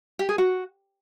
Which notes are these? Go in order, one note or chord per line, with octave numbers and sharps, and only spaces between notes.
G4
G#4
F#4